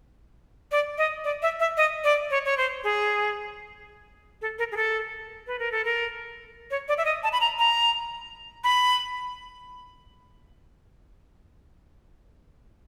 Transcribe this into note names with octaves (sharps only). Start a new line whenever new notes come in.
D5
D#5
D5
E5
E5
D#5
D5
C#5
C#5
C5
G#4
A4
A#4
G#4
A4
B4
A#4
A4
A#4
C#5
D5
E5
D#5
A5
B5
A#5
A#5
B5